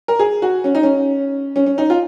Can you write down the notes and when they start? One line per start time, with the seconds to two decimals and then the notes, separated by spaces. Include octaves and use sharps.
0.08 A#4
0.19 G#4
0.42 F#4
0.64 C#4
0.75 D#4
0.83 C#4
1.56 C#4
1.66 C#4
1.78 D#4
1.90 F4